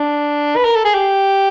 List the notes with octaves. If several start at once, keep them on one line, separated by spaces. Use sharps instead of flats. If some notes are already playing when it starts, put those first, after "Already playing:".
Already playing: D4
B4
A#4
A4
G#4
G4